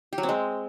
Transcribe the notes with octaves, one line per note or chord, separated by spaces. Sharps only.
G4
F#3
C4
G#3